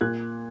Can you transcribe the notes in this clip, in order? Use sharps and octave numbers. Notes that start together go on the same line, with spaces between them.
A#2 F#6 G#6